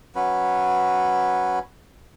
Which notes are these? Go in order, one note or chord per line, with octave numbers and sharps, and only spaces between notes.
F#3 C#4 B4